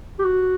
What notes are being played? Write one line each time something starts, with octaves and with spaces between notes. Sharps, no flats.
G4
F#4